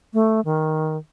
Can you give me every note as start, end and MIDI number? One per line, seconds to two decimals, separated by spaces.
0.14 0.41 57
0.45 0.97 51